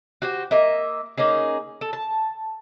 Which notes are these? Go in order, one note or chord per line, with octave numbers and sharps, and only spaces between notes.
F#4 G4 C5
A#3 A#4 D#5 E5
A#3 C#4 D#4 G#4
A4
A5